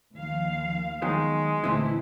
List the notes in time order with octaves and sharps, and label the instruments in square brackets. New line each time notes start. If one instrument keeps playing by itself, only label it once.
[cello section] D#2 F3 F5
[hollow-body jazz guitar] D#3 F#3 B3 [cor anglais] G#3
[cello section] D2 A#2 E4 [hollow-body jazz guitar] E3 C4 D4